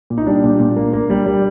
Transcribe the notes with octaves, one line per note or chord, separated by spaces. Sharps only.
A#2
D#4
G3 D4
A#2
A#2
A#3
A#3
G3
G3